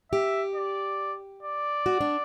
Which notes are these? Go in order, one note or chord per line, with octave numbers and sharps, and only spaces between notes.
G4 E5
D5
D5
F#4
D4